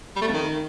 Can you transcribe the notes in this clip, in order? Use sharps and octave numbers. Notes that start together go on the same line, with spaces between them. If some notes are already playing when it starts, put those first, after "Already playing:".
G3
A3
F2
D#3